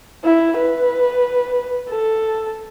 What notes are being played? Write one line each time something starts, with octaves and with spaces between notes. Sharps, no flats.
E4
B4
A4